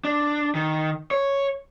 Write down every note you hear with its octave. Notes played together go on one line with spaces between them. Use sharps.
D4
D#3
C#5